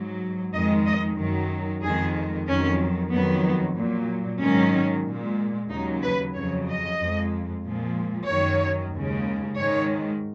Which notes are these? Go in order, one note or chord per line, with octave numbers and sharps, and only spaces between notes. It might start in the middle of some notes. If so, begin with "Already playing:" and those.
Already playing: G#2 F#3
F2 D#3 G#3 D#5
D#5
F#2 D#3 F#3
F2 D#3 G#3 G#4
F2 D#3 F#3 C#4
F2 D#3 F#3 B3
A#2 F#3
G#2 D#3 F#3 C#4
A#2 G#3
D#2 C#3 F#3 D#4
B4
F2 C#3 F#3 C#5
D#5
F2 F3 G#3
A#2 F3 G#3
F#2 D#3 F#3 C#5
D#2 C#3 G#3
G#2 D#3 G#3 C#5